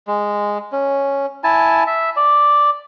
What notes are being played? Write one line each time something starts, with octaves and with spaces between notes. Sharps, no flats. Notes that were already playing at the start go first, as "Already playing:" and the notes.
G#3
C#4
E4 G#5 A5
E5
D5